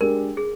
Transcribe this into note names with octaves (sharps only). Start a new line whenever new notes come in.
G#3 D4 G4 A#4
G#4